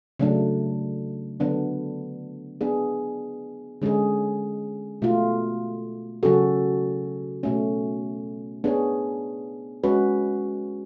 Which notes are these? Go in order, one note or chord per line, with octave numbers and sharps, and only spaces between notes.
C#3 F#3 A3 D4
D3 F#3 B3 D4
B3 D4 G#4
D3 G#3 C#4 G#4
B2 A3 F4
C#3 F#3 C#4 F#4 A4
B2 A3 C#4
B3 D4 G#4 C#5
G#3 C#4 F#4 B4